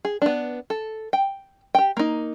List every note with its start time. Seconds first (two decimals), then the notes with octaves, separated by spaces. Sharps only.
0.05 G#4
0.22 B3 D4
0.70 A4
1.13 G5
1.75 G4 G5
1.97 A#3 D#4